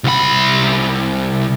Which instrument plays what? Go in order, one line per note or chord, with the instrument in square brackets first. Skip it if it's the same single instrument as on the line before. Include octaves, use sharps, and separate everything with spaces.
[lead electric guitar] C2 B5